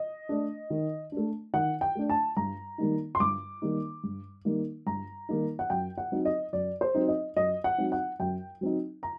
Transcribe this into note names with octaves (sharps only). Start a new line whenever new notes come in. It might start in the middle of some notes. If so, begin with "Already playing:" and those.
Already playing: D#5
A3 D4
D#3
A3 D4
D#3 F#5
G5
A3 D4
A5
G2 A#5
D#3 G3 A#3 D#4
C6
G2 D6
D#3 G3 A#3 D#4
G2
D#3 G3 A#3 D#4
G2 A#5
D#3 G3 A#3 D#4
F#5
F#2 G5
F#5
F#3 C4 D#4
D#5
F#2 D5
C5
F#3 C4 D#4
D#5
F#2 D#5
F#5
F#3 C4 D#4
F#5
F#2 G5
F#3 C4 D#4
A#5